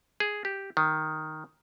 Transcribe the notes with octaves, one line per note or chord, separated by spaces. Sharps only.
G#4
G4
D#3